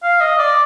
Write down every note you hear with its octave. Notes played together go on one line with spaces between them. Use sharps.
F5
D#5
D5